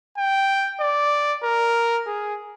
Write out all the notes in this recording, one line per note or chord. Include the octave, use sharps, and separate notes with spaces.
G5
D5
A#4
G#4